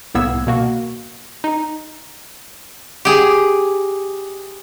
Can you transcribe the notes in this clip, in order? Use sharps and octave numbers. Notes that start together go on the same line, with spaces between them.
C2 A2 A#3 B3 E6 G#6
B2 A#3 F#4
D#4
G4 G#4